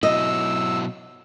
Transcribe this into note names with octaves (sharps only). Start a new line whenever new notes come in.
B2 F#3 E4 D#5 E6